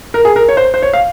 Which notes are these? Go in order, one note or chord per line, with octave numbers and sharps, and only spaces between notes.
A#4
G#4
A#4
C#5
C5
C5
C#5
F5